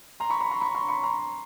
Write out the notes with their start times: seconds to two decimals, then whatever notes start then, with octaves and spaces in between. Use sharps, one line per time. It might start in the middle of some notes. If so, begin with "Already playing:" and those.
0.20 A#5 C6
0.30 B5 C#6
0.40 B5 C#6
0.51 A#5 C6
0.61 B5 C#6
0.75 A#5 C6
0.88 B5 C#6
1.03 A#5 C6